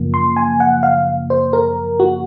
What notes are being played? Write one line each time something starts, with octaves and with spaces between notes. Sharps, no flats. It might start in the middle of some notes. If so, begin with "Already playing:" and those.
Already playing: F#2 C#3 F3 A#3
C6
G#5
F#5
F5
C5
A#4
F#4